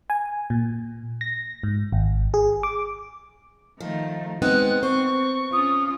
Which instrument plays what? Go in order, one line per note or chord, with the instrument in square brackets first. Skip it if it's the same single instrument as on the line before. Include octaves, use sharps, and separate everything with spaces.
[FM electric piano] G#5
A#2
A#6
G#2
G#1
G#4
D6
[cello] D#3 A3 [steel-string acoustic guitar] F3
[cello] G#3 [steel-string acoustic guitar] B3 C4 D#4 [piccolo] F#6
[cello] C4 [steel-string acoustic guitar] C5 [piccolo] C#6
[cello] C#4 F4 [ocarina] D#6